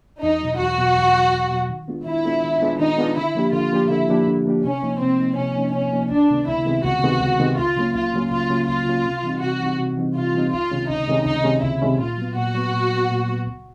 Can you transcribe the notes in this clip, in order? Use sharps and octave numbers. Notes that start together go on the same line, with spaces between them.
E2 D#4
B2 F#3
E2 F#4
B2 F#3
E2
B2 F#3
E2
B2 F#3
D#3
G#3 B3 D4 F4
D#3 E4
G#3 B3 D4 F4
D#3
G#3 B3 D4 F4
D#3 D#4
G#3 B3 D4 F4
D3 E4
F3 A#3 D4 G4
D3 F4
F3 A#3 D4 G4
D3 E4
F3 A#3 D4 G4
D3
F3 A#3 D4 G4
C3 C#4
F3 A#3 D#4
C3 C4
F3 A#3 D#4
C3 C#4
F3 A#3 D#4
C3 C#4
F3 A#3 D#4
C#2 D4
C3 D#3 G#3 B3
C#2 E4
C3 D#3 G#3 B3
C#2 F#4
C3 D#3 G#3 B3
C#2
C3 D#3 G#3 B3
C#2 F4
C#3 F#3 A#3 C#4
C#2 F4
C#3 F#3 A#3 C#4
C#2 F4
C#3 F#3 A#3 C#4
C#2 F4
C#3 F#3 A#3 C#4
C3
E3 G3 C4 D#4
C3 F#4
E3 G3 C4 D#4
C3
E3 G3 C4 D#4
C3 F4
E3 G3 C4 D#4
C#2 F4
C3 D#3 G#3 C#4
C#2 D#4
C3 D#3 G#3 C#4
C#2 D#4
C3 D#3 G#3 C#4
C#2 E4
C3 D#3 G#3 C#4
A#2 F4
F#3 B3
A#2 F#4
F#3 B3
A#2
F#3 B3
A#2
F#3 B3
C#2